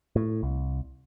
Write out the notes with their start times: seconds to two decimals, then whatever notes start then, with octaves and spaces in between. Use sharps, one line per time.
0.16 A2
0.43 C2